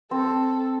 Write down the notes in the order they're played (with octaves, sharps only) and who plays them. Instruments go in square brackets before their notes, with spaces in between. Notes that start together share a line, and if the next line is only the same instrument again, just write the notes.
[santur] C4 [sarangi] A4